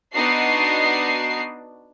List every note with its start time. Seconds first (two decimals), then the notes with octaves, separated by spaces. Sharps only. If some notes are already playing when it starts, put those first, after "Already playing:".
0.15 B3 D4 D#4 F#4 C7